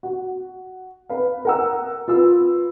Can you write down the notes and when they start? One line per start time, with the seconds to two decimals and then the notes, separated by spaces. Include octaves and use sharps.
0.03 F#4
1.09 B4 F5
1.45 A#4 F#5 E6
2.08 F4 B4 E6